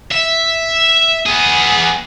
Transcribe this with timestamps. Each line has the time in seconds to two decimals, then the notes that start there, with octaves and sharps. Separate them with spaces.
0.12 E5
1.26 B3 G#4